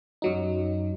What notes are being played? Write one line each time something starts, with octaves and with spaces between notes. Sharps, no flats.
F#2 F#3 D#4